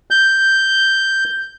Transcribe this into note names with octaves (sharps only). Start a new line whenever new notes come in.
G6